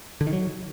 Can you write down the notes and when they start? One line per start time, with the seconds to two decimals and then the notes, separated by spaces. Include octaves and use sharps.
0.21 D3
0.27 D#3
0.33 F#3